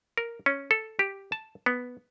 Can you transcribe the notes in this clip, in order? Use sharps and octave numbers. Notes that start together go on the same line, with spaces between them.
A#4
C#4
A4
G4
A5
B3